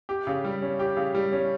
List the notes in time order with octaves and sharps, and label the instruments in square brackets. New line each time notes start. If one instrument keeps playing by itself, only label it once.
[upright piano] G4
C#3
G3
C#4
G4
C#3
G3
C#4